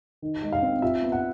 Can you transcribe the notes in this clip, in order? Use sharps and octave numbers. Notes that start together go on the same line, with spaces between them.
D#3
G#3
F5
C4
F4 E5
B3
F#5